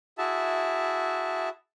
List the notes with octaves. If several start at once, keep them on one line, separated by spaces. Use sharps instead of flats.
E4 F#4 G#4 E5 A5